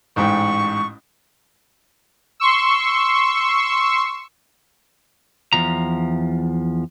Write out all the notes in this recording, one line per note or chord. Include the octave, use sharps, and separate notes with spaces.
A1 G#2 G5 C#6
C6 C#6 E6
E2 F3 A#5